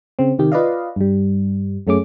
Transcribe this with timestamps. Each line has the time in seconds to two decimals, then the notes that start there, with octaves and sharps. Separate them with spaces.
0.19 C#3 C4
0.39 C3 D#3 G4
0.52 F4 B4 D5 D#5 F5
0.96 G2 G3
1.87 F#2 A3 C#4 G#4 D6